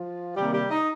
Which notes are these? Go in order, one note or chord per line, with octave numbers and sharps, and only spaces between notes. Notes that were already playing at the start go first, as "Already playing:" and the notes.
Already playing: F3 F4
C3 D#3 G3 A#3 G4
G3 G4
D#4 D#5